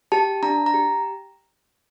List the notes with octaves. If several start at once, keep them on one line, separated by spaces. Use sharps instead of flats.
G4 A5
D4 A#5
A#5
G4